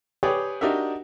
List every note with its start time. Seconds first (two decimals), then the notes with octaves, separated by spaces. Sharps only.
0.23 G4 G#4 B4 C#5 D5 G5
0.61 D4 D#4 F#4 G4 A#4 E5